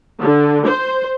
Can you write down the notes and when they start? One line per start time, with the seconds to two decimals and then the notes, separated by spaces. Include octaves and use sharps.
0.21 D3
0.67 C5